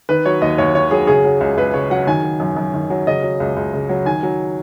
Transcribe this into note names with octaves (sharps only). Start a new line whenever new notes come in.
D#3 B4
F#3 C#5
D#2 D#5
D#2 C#5
D#3 C#5
F#3 G#4
C#3 G#4
F#3
C#2
C#2 B4
C#3 C#5
F#3 F#5
D#3 G#5
F#3
F#2
F#2
D#3
F#3
C#3 D#5
F#3
C#2
C#2
C#3
F#3
D#3 G#5
F#3